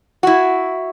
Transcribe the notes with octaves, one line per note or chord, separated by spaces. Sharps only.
E4 F#4